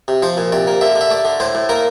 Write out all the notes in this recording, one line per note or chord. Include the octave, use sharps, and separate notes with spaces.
C3
F3 C5
A#2
C3 D5
A#3
D3 E5
D3
E5
A3 D5
D3
A2 C5
A2
A#3 A#4